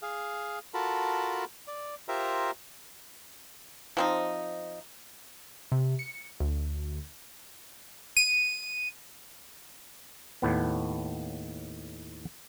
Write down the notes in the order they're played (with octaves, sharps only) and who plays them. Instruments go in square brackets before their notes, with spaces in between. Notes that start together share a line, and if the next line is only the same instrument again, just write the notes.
[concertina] G#4 F5
F4 F#4 A4 A#4 A5 B5
D5
F4 G4 A#4 C5 E5 A#5
[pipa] F3 C4 D#4
[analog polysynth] C3
C#7
D2
[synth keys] D#7
[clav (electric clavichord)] D#2 A2 B3